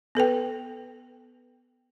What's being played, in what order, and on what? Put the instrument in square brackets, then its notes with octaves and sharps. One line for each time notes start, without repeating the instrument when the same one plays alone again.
[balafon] B3 A4 B4 G5